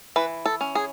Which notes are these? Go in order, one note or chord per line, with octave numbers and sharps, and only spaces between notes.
E3 B4
A4
C#4
G#4